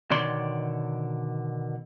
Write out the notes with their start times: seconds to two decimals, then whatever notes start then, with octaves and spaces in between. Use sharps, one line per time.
0.11 B2 D3 D#3 C#5 D5 C6